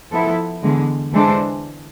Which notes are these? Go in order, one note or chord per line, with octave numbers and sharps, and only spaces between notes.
F3 B3 E4 A4
E2 D3 G#3
E3 G#3 D4 A4 C5